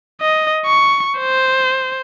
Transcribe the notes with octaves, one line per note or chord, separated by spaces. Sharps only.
D#5
C#6
C5